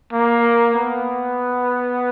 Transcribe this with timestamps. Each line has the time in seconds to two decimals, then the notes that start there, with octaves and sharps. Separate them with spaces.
0.13 A#3
0.76 B3